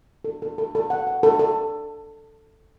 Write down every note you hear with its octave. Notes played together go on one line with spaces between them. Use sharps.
A4
A4
A4
A4
F#5
F#5
A4
A4